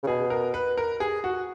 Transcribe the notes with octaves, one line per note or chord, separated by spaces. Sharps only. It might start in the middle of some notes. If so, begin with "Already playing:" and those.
C#3
B2 G#4
A#4
B4
A#4
G#4
F#4